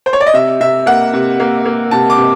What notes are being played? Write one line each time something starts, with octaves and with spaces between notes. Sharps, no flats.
C5
C#5
D5
D#5
C3 E5
C3 E5
A#3 F#5
C3
A#3
A#3
C3 A5
D6
C3